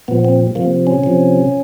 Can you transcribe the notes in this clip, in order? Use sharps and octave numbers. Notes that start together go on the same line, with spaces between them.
A#2 F3 B3
C4
C3 F3 A#3
C#4
C3 F3